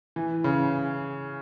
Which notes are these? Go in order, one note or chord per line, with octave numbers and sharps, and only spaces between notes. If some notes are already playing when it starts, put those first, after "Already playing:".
E3
C#3